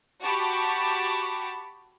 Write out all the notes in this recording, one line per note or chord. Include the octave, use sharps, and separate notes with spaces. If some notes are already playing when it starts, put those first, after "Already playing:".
F#4 G4 A5 B5 C#6 D6